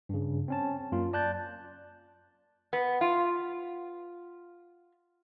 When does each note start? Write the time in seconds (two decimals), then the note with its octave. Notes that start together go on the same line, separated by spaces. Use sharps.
0.09 G2 C#3
0.48 C4 C#4 A5
0.92 F#2 A#3 F4
1.13 D5 A5 F#6 G6 A6
2.73 B3
3.01 F4